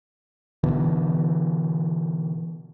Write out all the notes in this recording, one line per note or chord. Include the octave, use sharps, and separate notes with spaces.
B2 D3 E3 B3